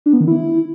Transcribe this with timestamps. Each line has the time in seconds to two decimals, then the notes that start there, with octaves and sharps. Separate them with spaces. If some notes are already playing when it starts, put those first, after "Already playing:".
0.06 D4
0.13 B3
0.20 D#3
0.28 E4